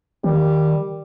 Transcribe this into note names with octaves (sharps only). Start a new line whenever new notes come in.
D#3 G3